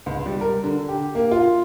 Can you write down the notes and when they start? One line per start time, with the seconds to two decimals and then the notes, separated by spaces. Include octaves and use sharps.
0.06 C#2
0.26 G3
0.41 A#4
0.64 D3
0.89 G4
1.15 A#3
1.31 F4